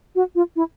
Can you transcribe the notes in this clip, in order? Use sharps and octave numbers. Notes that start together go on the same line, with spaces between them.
F#4
F4
E4